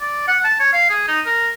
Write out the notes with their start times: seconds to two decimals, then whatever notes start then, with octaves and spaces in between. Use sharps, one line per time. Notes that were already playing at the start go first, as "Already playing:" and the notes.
0.01 D5
0.28 F#5
0.45 A5
0.60 C#5
0.73 F5
0.90 G#4
1.08 D#4
1.26 A#4